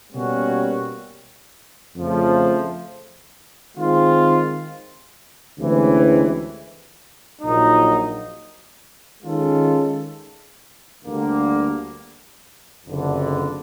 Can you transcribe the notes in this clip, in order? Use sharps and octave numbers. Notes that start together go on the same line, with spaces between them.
B2 G3 A#3 C#4 F#4
F2 C#3 F3 A3
D#3 G#3 C4 F4
D2 C3 E3 G#3 C#4
A#1 A#2 F#3 A#3 D#4
D#3 G#3 C#4 F4 A4
D2 D3 G3 A#3
F#1 F2 D3